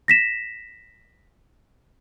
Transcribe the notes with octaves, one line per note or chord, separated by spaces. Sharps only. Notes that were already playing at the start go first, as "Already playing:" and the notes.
A#6 B6 E7